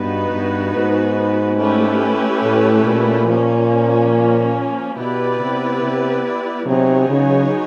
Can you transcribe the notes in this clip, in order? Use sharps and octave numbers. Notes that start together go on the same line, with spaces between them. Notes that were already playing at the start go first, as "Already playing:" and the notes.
Already playing: G2 B3 D#4 F#4 B4
G2
G#2
A3 C#4 E4 G4 B4
A2
A#2
F3 A#3 C#4
B2 B3 E4 G4 B4 D5
C3
C3
C3 F#3 B3 D#4 G#4 C#5
C#3